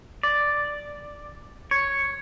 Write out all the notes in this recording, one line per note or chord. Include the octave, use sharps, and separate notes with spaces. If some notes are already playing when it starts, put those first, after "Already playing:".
D5
C#5